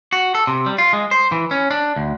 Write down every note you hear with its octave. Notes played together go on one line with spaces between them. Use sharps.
F#4
A4
C3
G3
F4
G#3
C5
E3
C#4
D4
D2